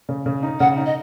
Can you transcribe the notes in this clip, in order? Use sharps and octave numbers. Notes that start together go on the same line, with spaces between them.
C#3
C#3
D#4
C#3 F#5
D#4
D#5